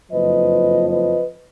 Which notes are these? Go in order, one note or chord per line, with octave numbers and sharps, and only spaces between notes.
F#1 F2 F3 B4 D#5
B4 D#5